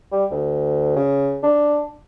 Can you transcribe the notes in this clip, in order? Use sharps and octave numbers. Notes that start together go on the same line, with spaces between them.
G3
D2
C#3
D4